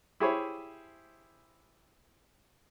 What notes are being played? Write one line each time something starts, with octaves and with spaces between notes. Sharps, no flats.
E4 G4 G#4 C5 C#5 B5